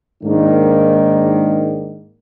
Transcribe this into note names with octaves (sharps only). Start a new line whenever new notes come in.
G#2 D#3 A#3 D4